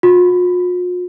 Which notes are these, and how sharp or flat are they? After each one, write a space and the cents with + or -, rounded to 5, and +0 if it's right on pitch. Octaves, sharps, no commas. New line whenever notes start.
F4 +45